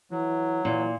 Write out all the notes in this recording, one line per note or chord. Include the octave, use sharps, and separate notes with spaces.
E3 F#3
A#2 E3